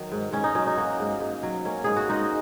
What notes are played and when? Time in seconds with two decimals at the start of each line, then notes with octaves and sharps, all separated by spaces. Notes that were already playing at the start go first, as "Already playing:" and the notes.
Already playing: D#3 F#3 D#5
0.12 G#2
0.33 G#2 C#4
0.44 D#4
0.55 F#3 C#4
0.67 D#4
0.78 A#3 F#4
1.00 G#2
1.21 G#2
1.43 F#3
1.65 A#3 C#4
1.84 G#2 G#4
1.97 F#4
2.09 G#3 D#4